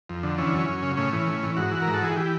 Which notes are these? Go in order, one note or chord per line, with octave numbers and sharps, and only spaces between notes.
F2
D3
E3 C#4
F#2
F#2
C#3
A2 C#4
E3
A2
E3
G#2 F#4
E3
A#4
G#2
A4
E3 G#4
E3 G4